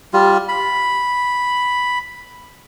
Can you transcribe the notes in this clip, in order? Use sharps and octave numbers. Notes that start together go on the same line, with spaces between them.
G3 F4
B5